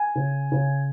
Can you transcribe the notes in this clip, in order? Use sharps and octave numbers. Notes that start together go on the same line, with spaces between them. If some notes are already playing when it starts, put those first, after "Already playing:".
Already playing: G#5
C#3
C#3